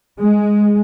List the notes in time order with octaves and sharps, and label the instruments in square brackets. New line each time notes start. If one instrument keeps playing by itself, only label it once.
[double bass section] G#3